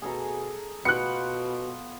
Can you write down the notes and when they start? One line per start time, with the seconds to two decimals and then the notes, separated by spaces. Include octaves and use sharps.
0.02 B2 G#4 A4 A#5
0.85 B2 B3 F4 G5 F#6 C#7